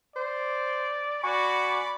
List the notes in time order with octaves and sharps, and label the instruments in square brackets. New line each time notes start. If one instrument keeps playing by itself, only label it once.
[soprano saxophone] C5 [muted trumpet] D5
[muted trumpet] F#4 [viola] D5 B5 [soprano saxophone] G#5 [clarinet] C#6